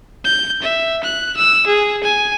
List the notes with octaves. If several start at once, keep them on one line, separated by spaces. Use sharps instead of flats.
G6
E5
F#6
E6
G#4
G#5